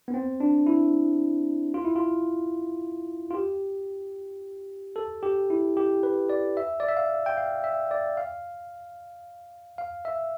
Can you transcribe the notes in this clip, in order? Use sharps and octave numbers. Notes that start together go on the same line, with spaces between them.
B3
C4
D4
E4
F4
E4
F4
F4
G4
A4
G4
E4
G4
B4
D5
E5
D5
E5
F5
G5
F5
E5
D5
F5
F5
E5